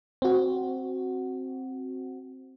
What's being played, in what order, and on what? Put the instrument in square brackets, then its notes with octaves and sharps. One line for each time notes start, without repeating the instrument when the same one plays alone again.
[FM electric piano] C4 F#4